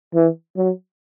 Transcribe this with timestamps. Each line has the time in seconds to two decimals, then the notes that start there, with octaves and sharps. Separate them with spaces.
0.15 E3
0.57 F#3